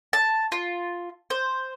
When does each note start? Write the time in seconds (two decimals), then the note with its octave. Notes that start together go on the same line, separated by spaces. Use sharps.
0.13 A5
0.52 F4
1.30 C5